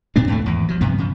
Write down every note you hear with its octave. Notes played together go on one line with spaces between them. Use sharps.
A2 B3 C4 D4
D#2 A2 A3
G#1 E2
F3 F#3
G2 C3 B3
C#3 F3